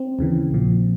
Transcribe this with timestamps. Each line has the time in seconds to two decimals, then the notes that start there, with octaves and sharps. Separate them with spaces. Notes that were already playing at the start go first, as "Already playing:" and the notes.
Already playing: C4
0.19 D#2 C#3 E3
0.51 A#1 A#2 F3